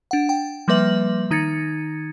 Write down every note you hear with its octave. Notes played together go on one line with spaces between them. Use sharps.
D4 F#5
G5
F3 G3 A#3 B4 E5 F#7
D#3 D#4 G#6 A6 C#7